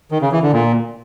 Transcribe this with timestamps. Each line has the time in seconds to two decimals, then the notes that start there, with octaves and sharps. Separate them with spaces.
0.11 D#3
0.22 C#3
0.32 E3
0.42 D3
0.53 A#2